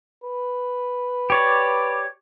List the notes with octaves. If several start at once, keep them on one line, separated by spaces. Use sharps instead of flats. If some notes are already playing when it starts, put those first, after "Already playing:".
B4
G4 C#5 D5